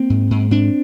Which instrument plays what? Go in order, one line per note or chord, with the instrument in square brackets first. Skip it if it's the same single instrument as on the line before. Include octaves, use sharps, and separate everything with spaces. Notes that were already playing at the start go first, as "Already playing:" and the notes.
Already playing: [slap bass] A#3 C4
G#2
G#2
G#2 C4 D4